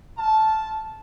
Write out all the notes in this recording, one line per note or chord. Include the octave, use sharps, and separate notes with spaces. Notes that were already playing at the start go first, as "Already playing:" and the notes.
F4 A5